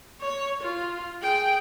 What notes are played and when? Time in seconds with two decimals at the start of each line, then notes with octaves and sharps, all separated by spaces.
0.21 C#5
0.62 F4
1.22 G#4 G5